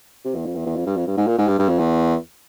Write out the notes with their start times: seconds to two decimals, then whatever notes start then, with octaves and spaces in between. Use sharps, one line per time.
0.25 C3
0.35 E2
0.46 F2
0.55 E2
0.66 E2
0.76 F2
0.86 G2
0.97 F2
1.07 G2
1.17 G#2
1.27 A#2
1.38 G#2
1.48 G2
1.59 G2
1.69 F2
1.79 E2